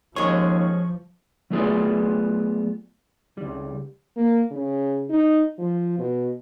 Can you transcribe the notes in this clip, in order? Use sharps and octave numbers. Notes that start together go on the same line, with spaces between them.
D#2 F3 G#3 C#4 C#6
F#3 A3 B3 F4 G#4 D5
C#2 G3
A#3
C#3
D#4
F3
B2